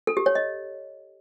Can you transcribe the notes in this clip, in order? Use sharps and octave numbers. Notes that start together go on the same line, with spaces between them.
A4
G4
C#5
D#5